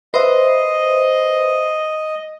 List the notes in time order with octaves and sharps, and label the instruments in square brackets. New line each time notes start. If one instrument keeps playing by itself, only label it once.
[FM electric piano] B4 E5 [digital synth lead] C5 [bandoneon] D#5